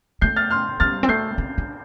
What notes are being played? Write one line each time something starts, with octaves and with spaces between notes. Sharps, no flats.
A3 G6 C7
F6 A6
C6 F6
G3 F6 A6
C4
A3 G6 C7
C4
D4